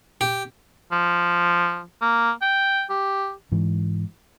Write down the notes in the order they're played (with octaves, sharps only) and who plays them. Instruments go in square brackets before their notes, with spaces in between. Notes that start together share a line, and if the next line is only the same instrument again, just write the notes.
[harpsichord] G4
[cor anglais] F3
A#3
G5
G4
[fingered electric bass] G#2 E3